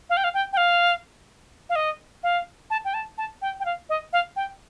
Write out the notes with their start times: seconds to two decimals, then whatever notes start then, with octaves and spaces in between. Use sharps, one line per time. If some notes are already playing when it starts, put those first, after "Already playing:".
0.10 F5
0.17 G5
0.24 F5
0.34 G5
0.53 G5
0.57 F5
1.69 F5
1.76 D#5
2.23 F5
2.70 A5
2.85 G5
2.94 A5
3.18 A5
3.42 G5
3.60 G5
3.65 F5
3.89 D#5
4.13 F5
4.36 G5